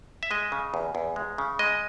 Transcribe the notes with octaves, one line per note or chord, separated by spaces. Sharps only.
E5
G#3 D#5
C#3
E2
E2
G#3
C#3
G#3 D#5